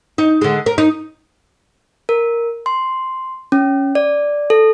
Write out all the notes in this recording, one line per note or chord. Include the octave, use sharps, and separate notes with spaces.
D#4
D3 G#3
A#4
D#4
A#4
C6
C#4
D5
A4